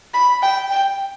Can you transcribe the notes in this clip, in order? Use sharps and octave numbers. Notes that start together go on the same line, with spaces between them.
B5
G5
G5